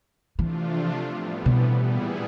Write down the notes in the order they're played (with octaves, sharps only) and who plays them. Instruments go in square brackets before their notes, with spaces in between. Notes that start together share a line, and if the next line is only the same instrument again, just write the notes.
[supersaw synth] C3 F3 A3 D4 F4 [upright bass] E3
[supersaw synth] A2 E3 G3 B3
[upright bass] B2
[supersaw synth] A#2 G3 B3 E4 G#4